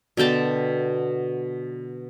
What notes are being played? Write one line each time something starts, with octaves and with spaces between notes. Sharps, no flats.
B2 D3 G5 A5